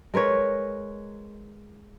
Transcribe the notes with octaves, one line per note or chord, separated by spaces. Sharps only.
G#3 A#4 B4 C#5